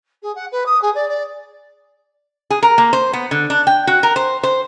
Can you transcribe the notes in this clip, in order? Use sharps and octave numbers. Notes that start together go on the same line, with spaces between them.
G#4
F#5
B4
D#6
G#4
D5
D5
G#4
A#4
A#3
C5
B3
D3
D4
G5
F#4
A#4
C5
C5